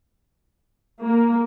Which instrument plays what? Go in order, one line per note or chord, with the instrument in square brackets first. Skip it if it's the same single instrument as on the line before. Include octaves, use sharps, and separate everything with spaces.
[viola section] A#3